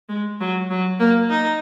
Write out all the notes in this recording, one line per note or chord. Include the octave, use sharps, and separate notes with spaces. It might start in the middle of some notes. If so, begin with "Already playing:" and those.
G#3
F#3
F#3
A#3
D#4